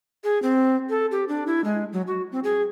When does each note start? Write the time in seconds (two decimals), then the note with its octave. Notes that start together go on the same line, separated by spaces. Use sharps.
0.24 G#4
0.43 C4
0.90 A4
1.11 G4
1.28 D4
1.47 E4
1.64 G#3
1.93 F#3
2.07 F#4
2.32 C4
2.44 G#4